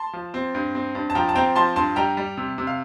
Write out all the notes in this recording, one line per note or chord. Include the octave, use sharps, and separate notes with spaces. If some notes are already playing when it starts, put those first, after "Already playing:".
Already playing: A5 C6
F3
C4
G2
C4
G2
A5
F3 G5 A#5
A5
C4 G5 A#5
F3 A5 C6
G2 A5 C6
G3 G5 A#5
G3
C3
C3
F5